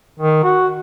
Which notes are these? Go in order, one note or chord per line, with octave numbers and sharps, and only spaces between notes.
D#3
F#4